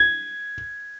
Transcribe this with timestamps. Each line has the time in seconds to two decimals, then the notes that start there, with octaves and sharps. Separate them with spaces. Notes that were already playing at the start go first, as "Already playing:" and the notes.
Already playing: G#6